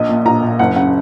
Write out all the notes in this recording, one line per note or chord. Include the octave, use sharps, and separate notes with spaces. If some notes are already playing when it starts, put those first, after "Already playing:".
Already playing: A#1 D#5
A#2
A#1 A#5
A#2
F#1 F#5
C#3 F#5